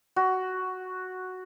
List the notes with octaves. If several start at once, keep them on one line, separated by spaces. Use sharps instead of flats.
F#4